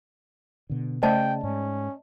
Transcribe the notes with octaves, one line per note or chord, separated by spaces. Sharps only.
B2 D3
C#3 A3 C5 D5 D#5 G5 A5
G#2 C#4